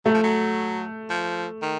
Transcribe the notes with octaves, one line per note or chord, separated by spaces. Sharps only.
F#3 A3
F3
F#3
F3
D#3